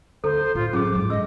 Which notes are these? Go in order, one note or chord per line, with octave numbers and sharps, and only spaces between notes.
D2 A4 C5
A2 F4
F#3 C#4 F4 G#4 D6
G#2 F3
A2 G#3 D#5 E6